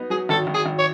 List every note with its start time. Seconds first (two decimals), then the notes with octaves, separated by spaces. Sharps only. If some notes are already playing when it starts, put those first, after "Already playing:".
Already playing: F#3 B3 D#4
0.10 F#3 G#4
0.29 G#1 A4
0.47 G#1
0.54 G#4
0.66 G#1
0.78 C#5